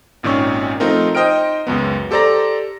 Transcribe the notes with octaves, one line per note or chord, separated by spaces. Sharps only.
G#1 A#2 D#3 C#4 C#6
F3 A3 C4 D#4 F4 A#4
D#4 C5 D#5 G5 F6 D7
C#2 F#2 B3
G4 A4 C5 D5 A#5 A#6